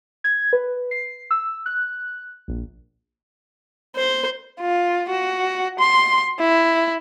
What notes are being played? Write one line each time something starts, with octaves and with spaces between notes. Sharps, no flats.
G#6
B4
C7
E6
F#6
A#1
C5
F4
F#4
C6
E4